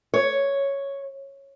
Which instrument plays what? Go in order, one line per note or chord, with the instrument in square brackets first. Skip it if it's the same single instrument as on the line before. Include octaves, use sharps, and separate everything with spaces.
[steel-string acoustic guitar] C#5